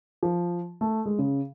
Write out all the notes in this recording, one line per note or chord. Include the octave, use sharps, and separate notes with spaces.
F3
A3
G#3
C#3